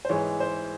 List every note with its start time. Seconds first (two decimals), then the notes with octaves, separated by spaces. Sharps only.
0.05 C5
0.09 G#2 E3 G#3 C#5
0.40 C5